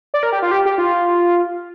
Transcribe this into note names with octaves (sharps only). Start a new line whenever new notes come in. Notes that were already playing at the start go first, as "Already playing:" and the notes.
D5
A#4
G4
F4
G4
G4
F4